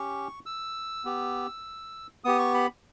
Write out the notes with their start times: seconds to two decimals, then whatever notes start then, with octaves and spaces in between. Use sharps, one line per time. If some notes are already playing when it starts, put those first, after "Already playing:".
Already playing: C#4 G4 C#6
0.46 E6
1.05 B3 G4
2.24 B3 G4 D#6
2.39 C#6
2.55 B5